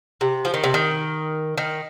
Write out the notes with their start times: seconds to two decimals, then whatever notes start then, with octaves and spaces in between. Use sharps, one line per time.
0.21 C3
0.45 F3
0.54 D#3
0.64 C3
0.74 D#3
1.58 D#3